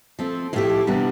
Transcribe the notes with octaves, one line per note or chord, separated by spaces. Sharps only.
F3 A3 C4
A2 F3 A3 E4 G4
C3 E3 G3 B3 D4